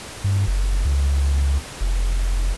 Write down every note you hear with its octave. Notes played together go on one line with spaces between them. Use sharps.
G2
F#1
C#2
F1